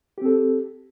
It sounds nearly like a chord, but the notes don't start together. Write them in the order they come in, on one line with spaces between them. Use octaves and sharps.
G4 C4 A4